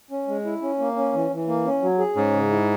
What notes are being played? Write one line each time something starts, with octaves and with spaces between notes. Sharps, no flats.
C#4
G#3
E4
C#4
A#3
C#4
E3
E3
A#3
C#4
F#3
G#4
G#2 C#4
C#3
E4